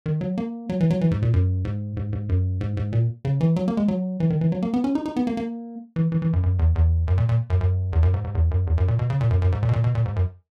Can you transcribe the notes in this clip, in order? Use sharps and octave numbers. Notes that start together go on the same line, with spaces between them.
D#3
F#3
A#3
F#3
E3
F#3
E3
G#2
A#2
F#2
G#2
G#2
G#2
F#2
G#2
G#2
A#2
C#3
E3
F#3
A#3
G#3
F#3
E3
D#3
E3
F#3
A#3
B3
C#4
D#4
D#4
B3
A#3
A#3
E3
E3
E3
F#2
F#2
E2
E2
F#2
A#2
A#2
F#2
F#2
E2
F#2
G#2
G#2
E2
F#2
E2
F#2
A#2
B2
C#3
A#2
F#2
F#2
G#2
A#2
B2
A#2
B2
A#2
G#2
F#2